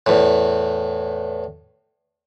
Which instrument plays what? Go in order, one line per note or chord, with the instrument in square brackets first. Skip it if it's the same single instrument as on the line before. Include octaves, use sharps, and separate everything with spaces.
[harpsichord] E2 A2